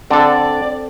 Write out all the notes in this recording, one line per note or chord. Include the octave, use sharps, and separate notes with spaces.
D3 C4 A4 D5